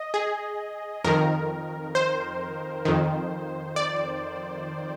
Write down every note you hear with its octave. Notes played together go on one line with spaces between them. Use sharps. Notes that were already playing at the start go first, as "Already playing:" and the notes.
Already playing: D#5
G#4
F2 D#3 A#4
C5
F2 D#3
D5